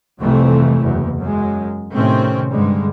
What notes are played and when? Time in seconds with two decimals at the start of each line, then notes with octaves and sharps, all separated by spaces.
0.20 C2 F2 C3 E3 A3
0.83 F#1 E2
1.20 F#2 G#3
1.93 A2 C3 D#3 C4 C#4
2.50 G2 D3 G3 G#3